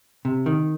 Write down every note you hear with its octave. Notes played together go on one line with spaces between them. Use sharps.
C3
D#3